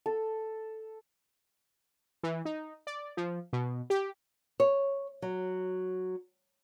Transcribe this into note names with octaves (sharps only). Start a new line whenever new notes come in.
A4
E3
D#4
D5
F3
B2
G4
C#5
F#3